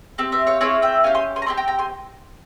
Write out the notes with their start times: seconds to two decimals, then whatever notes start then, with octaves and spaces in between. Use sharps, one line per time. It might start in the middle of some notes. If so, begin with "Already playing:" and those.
0.18 C4 G4
0.32 C5 E5
0.47 C#5 F5
0.61 C4 E4 G#4 C#5 F5
0.82 E5 G5
1.04 C#4 G4 F5 G#5
1.14 G#5 C6
1.36 G#5 C6
1.42 A#5
1.46 C4 E4 G4 G#5 C6
1.57 G5 A#5
1.68 G5 A#5
1.79 G#5 C6